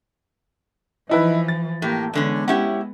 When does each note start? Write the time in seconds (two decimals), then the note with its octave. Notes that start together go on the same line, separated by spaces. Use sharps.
1.09 E3 F3 D#4 E4 B4
1.48 A6
1.82 A2 A#3 G4
2.13 E2 D3 G#3 B3 C#4
2.48 C#4 E4 G4 F#5